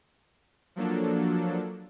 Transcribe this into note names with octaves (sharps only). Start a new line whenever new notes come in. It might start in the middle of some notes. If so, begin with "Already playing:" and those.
F3 F#3 A#3 D4 A4